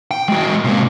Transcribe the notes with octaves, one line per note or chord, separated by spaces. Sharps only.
G5
G#3 F#4
C3 A#3